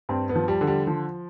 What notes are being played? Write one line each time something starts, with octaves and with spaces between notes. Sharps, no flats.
G2 C4
B3
F3
G3
D3
G3
F3